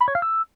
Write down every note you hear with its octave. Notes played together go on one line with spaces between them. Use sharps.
B5
C#5
F5
E6